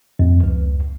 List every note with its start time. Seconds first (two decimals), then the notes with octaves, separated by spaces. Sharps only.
0.19 F2
0.44 C#2